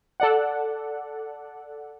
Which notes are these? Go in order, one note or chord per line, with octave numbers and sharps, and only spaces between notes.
A4 D5 F#5